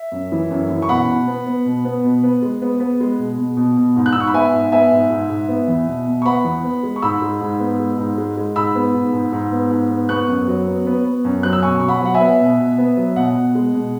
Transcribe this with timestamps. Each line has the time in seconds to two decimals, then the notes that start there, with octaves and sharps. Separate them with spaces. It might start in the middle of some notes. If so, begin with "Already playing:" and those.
Already playing: E5
0.12 F#2
0.32 E3
0.50 F#2
0.70 E3
0.82 C#6
0.89 B2 F#5 B5
1.08 B2
1.27 B3
1.46 B3
1.66 B2
1.85 B3
2.04 B2
2.23 B3
2.42 G#3
2.62 B3
2.80 B3
3.00 G#3
3.19 B2
3.39 B2
3.57 B2
3.77 B2
3.96 G#2
4.06 F#6
4.13 E6
4.15 G#2
4.20 C#6
4.27 B5
4.34 B3 E5 G#5
4.53 G#2
4.72 B3 E5 G#5
4.92 G#2
5.10 G#2
5.30 G#2
5.49 B3
5.68 E2
5.87 B2
6.07 B2
6.22 C#6
6.25 B3 F#5 B5
6.45 E2
6.64 B3
6.83 G#3
6.96 C#6
7.02 G#2 B5 E6
7.22 G#3
7.41 G#2
7.60 B3
7.80 G#3
7.98 G#2
8.18 G#3
8.37 G#3
8.56 G#2 B5 E6
8.75 B3
8.94 G#2
9.13 G#2
9.33 G#2
9.52 B3
9.71 G#2
9.90 B3
10.09 B3 C#6 F#6
10.28 F#2
10.48 F#3
10.67 B3
10.87 B3
11.05 B3
11.25 F#2
11.43 F#3 F#6
11.53 E6
11.62 B2 G#5 C#6
11.80 B2 C#6
11.88 F#5 B5
12.02 F#3 F#5
12.14 E5 G#5
12.20 B3
12.40 B2
12.59 B2
12.78 B3
12.97 F#3
13.16 B2 F#5
13.35 B2
13.55 G#3
13.74 B2